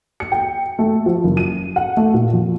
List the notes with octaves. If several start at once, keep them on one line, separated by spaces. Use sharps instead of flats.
C#7
G5
A3
F3
F#1
D#7
F#5
A3
A#2
F2